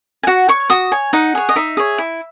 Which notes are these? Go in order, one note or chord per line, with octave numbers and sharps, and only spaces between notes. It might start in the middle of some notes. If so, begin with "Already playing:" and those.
G#5
F#4 F#5
C#5 C#6
F#4 D#6
C#5 G#5
D#4 F#5
G#4 C#5
D#5
D#4 E5
G#4 C#5
E4